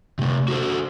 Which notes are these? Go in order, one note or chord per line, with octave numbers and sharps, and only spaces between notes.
C3 A3
F#4 A4 C5